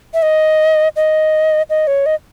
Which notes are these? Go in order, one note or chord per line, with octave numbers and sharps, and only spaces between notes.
E5
D#5
D#5
D#5
C#5
D#5